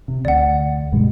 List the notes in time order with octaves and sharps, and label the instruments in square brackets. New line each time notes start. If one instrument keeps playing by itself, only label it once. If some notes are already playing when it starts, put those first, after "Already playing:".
[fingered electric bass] C3
[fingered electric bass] D2 [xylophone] D5 F#5
[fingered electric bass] G2 B2 G#3